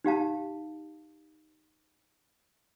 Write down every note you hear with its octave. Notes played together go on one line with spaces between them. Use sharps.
D#4 G4 F5 A5